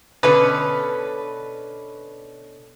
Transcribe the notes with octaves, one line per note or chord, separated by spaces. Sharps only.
B2 D3 C#4 B4